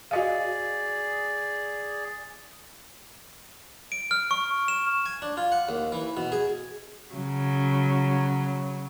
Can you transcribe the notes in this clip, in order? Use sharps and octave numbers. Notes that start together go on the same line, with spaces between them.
F#4 G#4 D5 D#5 F5
D7
F6
C#6
E7
G#5
D4
F4
F#5
D#2
E3
B2
G#4
C#3 F#3